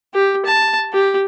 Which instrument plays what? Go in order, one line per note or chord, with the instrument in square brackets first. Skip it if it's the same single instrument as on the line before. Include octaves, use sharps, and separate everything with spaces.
[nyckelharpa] G4
A5
G4